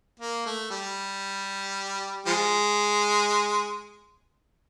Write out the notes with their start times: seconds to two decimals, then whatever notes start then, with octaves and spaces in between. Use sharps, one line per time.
0.20 A#3
0.46 A3
0.71 G3
2.26 F3 G#3